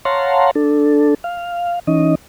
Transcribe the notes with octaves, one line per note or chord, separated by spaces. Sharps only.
C#5 F5 F#5 A5 A#5 C6
D4 A4
F5
E3 C#4 D#4 D#5